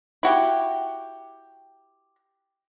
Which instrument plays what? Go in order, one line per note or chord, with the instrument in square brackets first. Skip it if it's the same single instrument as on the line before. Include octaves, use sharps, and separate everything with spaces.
[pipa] E4 F#4 G4